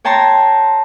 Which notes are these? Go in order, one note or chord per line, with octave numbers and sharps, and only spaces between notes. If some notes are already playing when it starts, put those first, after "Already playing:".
C#5 G5 A5 A#5 C6